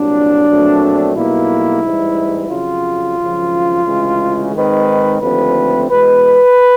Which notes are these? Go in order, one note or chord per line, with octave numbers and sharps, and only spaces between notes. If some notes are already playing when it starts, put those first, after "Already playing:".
Already playing: C2 A#2 F#3 D4
A#1 A#2 F#3 A3 C4
B1 B2 G3 A#3 E4
A1 G#2 E3 G3
F2 C#3 F#3 F4
G#1 F#2 C#3 F3
D2 C#3 E3 G#3
G#2 D#3 G#3 C4 B4
D#2 D3 F3 A3 C4 B4
E2 B2 G#3 B4